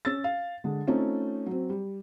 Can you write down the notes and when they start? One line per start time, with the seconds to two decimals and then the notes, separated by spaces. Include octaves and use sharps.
0.05 C#4 E6 A6
0.24 F5
0.64 D3 G#3
0.87 A3 C4 C#4 D#4 F4
1.46 F#3 C4
1.70 G3